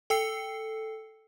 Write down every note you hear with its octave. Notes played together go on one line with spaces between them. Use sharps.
A4 G5 E6 C7 C#7